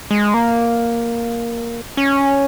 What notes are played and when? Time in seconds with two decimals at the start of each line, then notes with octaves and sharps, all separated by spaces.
0.11 G#3
0.34 A#3
1.97 C#4